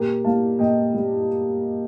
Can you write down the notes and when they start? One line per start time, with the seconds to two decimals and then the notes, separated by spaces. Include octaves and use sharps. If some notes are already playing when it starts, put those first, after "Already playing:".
Already playing: A#2 G4 A#4
0.24 G3 A#3 F5 A5
0.59 A#2 D#5 G5
0.94 G3 A#3